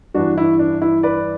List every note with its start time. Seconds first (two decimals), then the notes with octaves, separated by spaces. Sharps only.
0.14 G2 E3 D4 F#4
0.38 E4
0.59 D4
0.82 E4
1.03 B4 D5